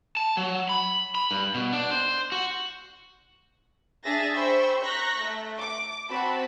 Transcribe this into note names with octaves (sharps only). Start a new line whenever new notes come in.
A5
F#3
B5
B5
G2
B2
D4
C5
F#4
D4 G#4 E5 A6 A#6
C5 G5 B5 C#6 E6
A#5 C#6 F#6 G6 A#6 B6
A3
D6
C4 F#4 A5 B5